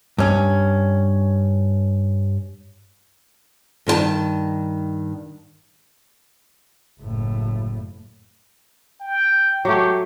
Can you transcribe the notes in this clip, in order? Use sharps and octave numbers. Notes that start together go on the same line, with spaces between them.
G2 C#4
G2 D#3 A#4 A5
F#1 A2
G5
F#3 A3 G4